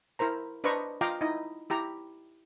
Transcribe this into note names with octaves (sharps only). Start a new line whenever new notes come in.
E4 A#4 C5 A#5
D4 B4 C5 D#5 A#5 C#6
F4 D#5 F5 G5 A#5 D6
D#4 E4 D#5
E4 G4 A#5